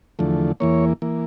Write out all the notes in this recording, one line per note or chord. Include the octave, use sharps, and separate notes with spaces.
E2 D3 F3 A3
E2 E3 A#3 C#5
E3 A#3